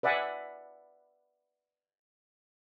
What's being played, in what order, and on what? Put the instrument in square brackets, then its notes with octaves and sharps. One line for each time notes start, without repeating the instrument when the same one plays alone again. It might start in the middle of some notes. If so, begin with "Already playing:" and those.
[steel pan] B4 D5 E5 F#5 G#5